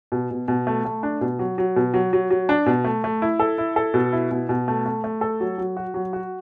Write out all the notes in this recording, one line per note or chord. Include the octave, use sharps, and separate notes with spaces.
B2
B2
B2
A3
A3
D4
B2
F#3
F#3
B2
F#3
F#3
F#3
D4
B2
A3
A3
E4
A4
E4
A4
B2
E4
B2
B2
A3
A3
A3
A4
F#3
F#3
F#4
F#3
F#4